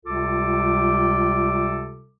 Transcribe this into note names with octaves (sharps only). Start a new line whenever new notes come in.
C#2 C3 G3 F4 A4 D6